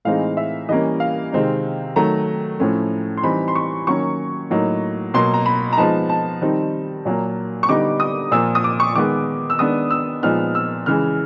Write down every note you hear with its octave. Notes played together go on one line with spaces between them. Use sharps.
A2 E3 G#3 C4 D#4 F5
E5
E3 G3 A#3 C#4 D#5
F5
C3 D#3 G#3 C4 D#4
D#3 F#3 A3 A#5
A2 F3 A3 C#4
C6
E3 G3 C4 D#4 B5
C6
C#6
D#3 F#3 A#3 C#4 C#6
A2 F#3 A#3 D#4
B2 F#3 A#3 C6
A#5
B5
A#5
F3 G#3 B3 D#4 A5
A5
D#3 G3 C4 D#4
A#2 F#3 A#3
C#6
D3 G3 B3 D#4 D6
D#6
A#2 F3 A#3 E6
D#6
D6
C#6
D#3 G#3 B3 D6
E6
D#3 G#3 B3 D4 D#6
E6
A#2 F3 G#3 B3 D#4 F6
E6
C#3 E3 G#3 F6